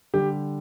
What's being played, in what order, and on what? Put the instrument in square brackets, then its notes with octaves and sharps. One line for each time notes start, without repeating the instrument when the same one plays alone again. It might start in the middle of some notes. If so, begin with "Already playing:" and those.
[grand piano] D3 G3 G4